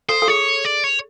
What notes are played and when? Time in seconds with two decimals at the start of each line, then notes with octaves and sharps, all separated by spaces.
0.09 A4 C5
0.22 A4
0.28 G#4 C#5
0.65 D5
0.84 C#5